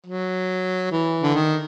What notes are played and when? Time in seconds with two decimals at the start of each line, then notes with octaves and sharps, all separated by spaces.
0.07 F#3
0.92 E3
1.23 D3
1.34 D#3